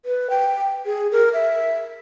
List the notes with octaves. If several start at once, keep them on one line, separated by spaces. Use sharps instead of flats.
B4
G5
G#4
A#4
E5